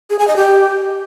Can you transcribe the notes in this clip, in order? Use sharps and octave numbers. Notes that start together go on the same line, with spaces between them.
G#4
G#5
D#5
G4